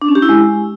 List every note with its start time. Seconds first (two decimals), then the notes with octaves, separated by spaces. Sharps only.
0.02 D4
0.08 C#4
0.15 G4
0.22 E4
0.29 G#3